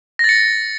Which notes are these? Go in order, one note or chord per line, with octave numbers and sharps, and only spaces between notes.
A6 A#6 C#7